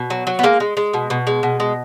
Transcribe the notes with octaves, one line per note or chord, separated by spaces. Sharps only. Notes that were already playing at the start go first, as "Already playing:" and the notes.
Already playing: B2
F#3
F#3
B3
G#3 A#3
G#3
G#3
B2
B2
G#3
B2
G#3